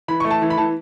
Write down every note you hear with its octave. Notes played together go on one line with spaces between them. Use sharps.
E3 B5
A3 C#6
A5
E3
B5
E3 A5